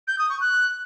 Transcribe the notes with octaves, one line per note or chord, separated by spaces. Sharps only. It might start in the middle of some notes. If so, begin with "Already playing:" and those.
G6
D#6
C#6
F#6